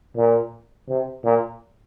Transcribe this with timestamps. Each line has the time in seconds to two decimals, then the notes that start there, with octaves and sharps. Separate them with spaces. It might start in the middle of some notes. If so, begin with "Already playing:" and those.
0.16 A#2
0.89 C3
1.24 A#2